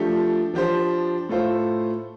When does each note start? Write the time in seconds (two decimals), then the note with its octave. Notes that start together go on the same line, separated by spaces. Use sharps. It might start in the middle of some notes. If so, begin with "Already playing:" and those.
Already playing: F3 A3 D4 G4
0.54 F3 D4 G4 C5
1.29 A2 A3 F4 C5